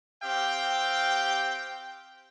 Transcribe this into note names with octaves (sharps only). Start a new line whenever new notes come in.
C4 G4 F5 G5